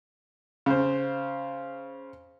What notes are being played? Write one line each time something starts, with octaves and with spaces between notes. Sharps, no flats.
C#3 C5